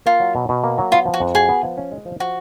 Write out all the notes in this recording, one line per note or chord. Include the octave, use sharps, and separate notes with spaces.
A#3 F4
F#3
B2
B2
A#3
F#3
B3 F4
F3
F#4
F2
F#4 G#4
B3
F3
C#4
G#3
F3
F3 F#4